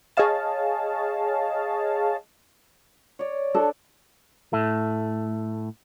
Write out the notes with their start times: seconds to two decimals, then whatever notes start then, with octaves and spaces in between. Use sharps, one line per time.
0.17 G#4 C#5 D#5 F5 A5
3.19 C#5 D5
3.55 D4 A4
4.53 A2 A3